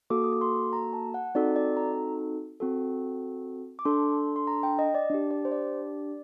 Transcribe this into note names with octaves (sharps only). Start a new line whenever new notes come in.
A#3 F#4 A4 D6
D#6
D6
C6
A#5
A5
F#5
C4 D#4 F#4 A4 D5
D5
A#5
C4 F#4 A4
D6
D4 A4 C6
C6
A#5
G5
D#5
D5
D4 G4
D5
C5
D5